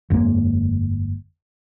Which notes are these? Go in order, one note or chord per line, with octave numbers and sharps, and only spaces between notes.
G1 F2 G#3 A#3